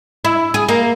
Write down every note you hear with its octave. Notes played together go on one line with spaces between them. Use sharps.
E4
G#4
A#3